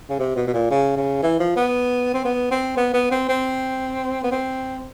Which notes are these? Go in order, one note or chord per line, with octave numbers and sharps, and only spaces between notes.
C#3
C3
B2
B2
A#2
C#3
C#3
E3
F3
B3
C4
B3
C4
B3
B3
C4
C4
B3
C4